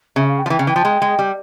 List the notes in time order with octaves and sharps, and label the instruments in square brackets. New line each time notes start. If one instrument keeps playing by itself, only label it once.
[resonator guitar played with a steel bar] C#3 [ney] E5
[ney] F5
G5
[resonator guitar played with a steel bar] F3 [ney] F5
[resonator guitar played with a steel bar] E3 [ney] G5
[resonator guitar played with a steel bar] C#3
[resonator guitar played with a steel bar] E3 [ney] G5
[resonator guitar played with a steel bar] F3
G#3
G#3
G3